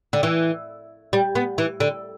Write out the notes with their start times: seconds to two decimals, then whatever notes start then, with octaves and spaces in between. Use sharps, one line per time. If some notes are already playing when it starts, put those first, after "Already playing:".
0.13 D3
0.23 E3
1.13 G3
1.35 B3
1.58 E3
1.80 D3